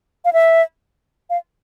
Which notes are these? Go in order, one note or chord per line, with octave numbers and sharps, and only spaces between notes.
F5
E5
F5